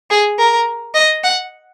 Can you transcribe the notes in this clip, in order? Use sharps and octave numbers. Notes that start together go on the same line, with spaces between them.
G#4
A#4
D#5
F#5